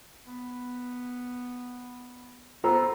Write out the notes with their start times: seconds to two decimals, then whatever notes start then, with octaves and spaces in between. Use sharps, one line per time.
0.26 B3
2.64 B3 F4 A4 C5 A#5